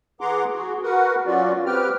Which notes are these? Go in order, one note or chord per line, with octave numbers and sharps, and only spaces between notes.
E3 G#4 F#5 A#5 C6 D6
F#4 G#4
F#4 A#4 B4 F#5
F#3 C#4 F4 F#4 D5
C4 G4 B4 G5 F6